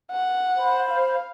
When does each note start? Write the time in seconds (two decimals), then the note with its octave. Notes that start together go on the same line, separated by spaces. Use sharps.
0.12 F#5
0.55 C5 B5
0.89 F5